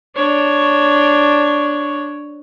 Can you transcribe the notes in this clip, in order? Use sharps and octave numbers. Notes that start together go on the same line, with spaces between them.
D4 C#5